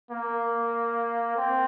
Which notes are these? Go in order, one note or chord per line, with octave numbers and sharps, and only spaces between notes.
A#3
C4